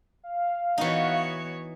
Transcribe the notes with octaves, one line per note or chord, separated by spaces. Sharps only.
F5
E3 B3 D#4 F#4 C#5